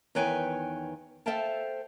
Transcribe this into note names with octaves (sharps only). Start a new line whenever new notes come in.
E2 D#3 B4 C#5 G5 G#5
A4 C5 E5 F5 G5 A5